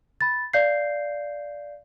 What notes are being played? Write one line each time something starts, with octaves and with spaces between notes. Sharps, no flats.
B5 A6
D5 F5 G6 C7